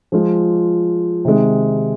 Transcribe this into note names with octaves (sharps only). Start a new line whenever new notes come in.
F3 G#3 F4
C3 D#3 G#3